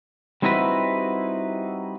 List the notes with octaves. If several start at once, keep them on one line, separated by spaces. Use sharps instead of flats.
G3 C4 D#4 E4 F#4 B4